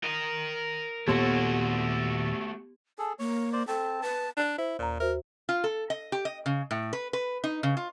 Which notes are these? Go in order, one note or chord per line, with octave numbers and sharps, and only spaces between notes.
A#4 D#5
D#2 A#2 A3 B3 F#4 G4 A4
G#4 A4 A5
A#3 C#5
C5 D5
C4 A4 A5
B4 A5
D4
E4 C5
D#2 A#2 A#5
F#4 A#4 C5 E5
F4
A4
D#5
G4
D#5
C#3
A2
B4
B4
D#4
C#3
F4